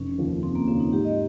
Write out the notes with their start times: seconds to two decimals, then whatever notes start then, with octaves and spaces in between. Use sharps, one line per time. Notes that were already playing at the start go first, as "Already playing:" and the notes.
Already playing: F1 C#4
0.18 D#2 C#3 F3
0.43 F1 C4
0.55 A#3
0.67 D#2 C#3 F3 C4
0.80 D#4
0.92 G#2 G4
1.05 D#5